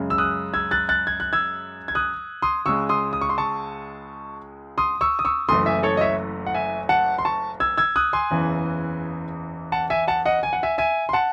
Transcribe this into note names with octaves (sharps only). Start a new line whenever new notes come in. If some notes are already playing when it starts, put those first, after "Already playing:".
Already playing: F#2 C#3 G#3
E6
D#6 F#6
E6 G#6
F#6 A6
F#6 A6
G#6
F#6
E6 G#6
G#6
D#6 F#6
C6 D#6
C#2 C#3 G#3 C#6 E6
C6 D#6
D#6
C#6
C6
A5 C#6
C6 D#6
C#6 E6
D#6
C#6 E6
F#1 F#2 E3 A3 C6 D#6
E5 G#5
A4 C#5
D#5
C#5 E5
F#5
E5 G#5
F#5 A5
C6
A5 C#6
E6 G#6
E6 G#6
D#6 F#6
G#5 C6
F#1 E2 C#3 E3
F#5 A5
E5 G#5
F#5 A5
D#5 F#5
G#5
F#5
E5 G#5
E5 G#5
C6
F#5 A5